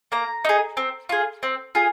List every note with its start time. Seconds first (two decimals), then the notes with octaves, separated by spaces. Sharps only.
0.12 A#3 A#5
0.45 D#4 G#4
0.77 C4
1.09 F4 G#4
1.43 C4
1.75 F4 G#4